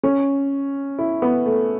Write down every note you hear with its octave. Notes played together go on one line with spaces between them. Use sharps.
C#4
E4
B3
A3